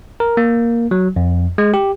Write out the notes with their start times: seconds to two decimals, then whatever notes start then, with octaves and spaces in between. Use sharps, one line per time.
0.20 A#4
0.37 A#3
0.91 F#3
1.16 F2
1.58 G#3
1.74 G4